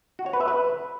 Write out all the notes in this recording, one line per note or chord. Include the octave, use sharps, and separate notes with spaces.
F#4
C#5
B4
E5
B4